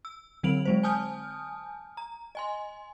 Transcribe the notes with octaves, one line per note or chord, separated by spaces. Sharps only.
E6
D3 F#3 C4 D7 F7 F#7
F#3 G#3 C5
G#5 A5 D#6 F6 G6
A#5
D#5 G#5 C6